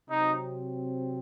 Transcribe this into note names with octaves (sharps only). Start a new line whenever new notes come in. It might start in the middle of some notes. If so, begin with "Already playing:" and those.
C3 F#3 C4 D#4